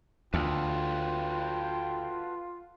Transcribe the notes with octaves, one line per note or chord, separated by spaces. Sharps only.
D2 F4 F#4 A4 B4 G5